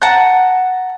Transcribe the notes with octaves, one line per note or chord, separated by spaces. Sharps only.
F#5 A5 A#5 F#6